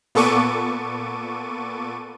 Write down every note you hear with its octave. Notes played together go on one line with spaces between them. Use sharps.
A#2 B3 A4 C#6 D6 D#7